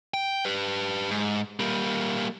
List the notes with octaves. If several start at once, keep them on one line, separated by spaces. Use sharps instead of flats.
G5
G4 B4
G#2
G3 A#3